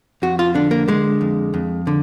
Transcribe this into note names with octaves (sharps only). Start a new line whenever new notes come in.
F2 F#4
F4
D3 D4
A#3
D3 G#3
F2
F2
D3